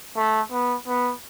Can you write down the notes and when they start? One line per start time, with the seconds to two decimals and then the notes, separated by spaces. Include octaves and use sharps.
0.16 A3
0.51 B3
0.87 B3